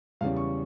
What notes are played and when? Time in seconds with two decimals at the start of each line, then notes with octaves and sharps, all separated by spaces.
0.21 E2 C#3 G3 C#4 F5
0.36 C#6